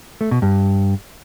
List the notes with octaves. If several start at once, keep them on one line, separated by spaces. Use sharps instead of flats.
A3
B2
G2